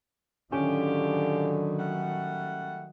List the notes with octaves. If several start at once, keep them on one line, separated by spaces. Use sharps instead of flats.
A2 D3 D#3 F#3 C#4 F4 G4
G3 A3 F#5